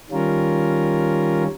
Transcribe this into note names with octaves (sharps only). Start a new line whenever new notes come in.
D#3 G3 C#4 F4 A#4